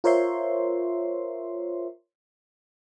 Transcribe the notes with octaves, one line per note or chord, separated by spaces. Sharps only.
F4 A#4 C5 C#5 E5 C6